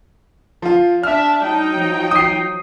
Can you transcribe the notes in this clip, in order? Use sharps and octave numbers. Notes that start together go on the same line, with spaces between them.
F3 F4
D4 E5 F6
F#3 D#4 G5
F3
D#6 C7